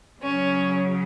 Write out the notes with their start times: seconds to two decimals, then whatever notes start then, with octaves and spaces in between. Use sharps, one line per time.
0.22 C#3 F#3 C#4